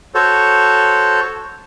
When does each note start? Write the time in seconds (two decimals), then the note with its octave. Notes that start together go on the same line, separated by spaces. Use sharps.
0.15 F#4 A4 C5 C#5